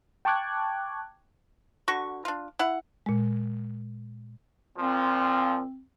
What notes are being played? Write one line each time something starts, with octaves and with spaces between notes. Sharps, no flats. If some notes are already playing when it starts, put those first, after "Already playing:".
G5 A5 C#6 D6 F#6 G#6
D3 F#4 C#6
D4 F4
E4 F#5
A#2 G#3
A#2 F3 C4